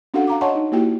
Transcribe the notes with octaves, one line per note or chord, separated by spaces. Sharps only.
C#4 D4 F#4 A4 F5 F#5
F5 A#5 D6
C#5 D#5 F#5 A5 C6 C#6
D#4
A#3 E4 F#4 G4 G5